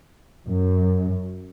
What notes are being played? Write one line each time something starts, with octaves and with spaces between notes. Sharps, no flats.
F#2